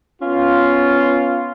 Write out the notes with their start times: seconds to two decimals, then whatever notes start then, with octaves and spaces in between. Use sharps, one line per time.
0.21 B3 C#4 F4